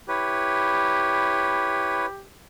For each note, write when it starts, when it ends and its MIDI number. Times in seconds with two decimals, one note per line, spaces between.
0.09 2.06 64
0.09 2.27 67
0.09 2.06 71
0.09 2.06 73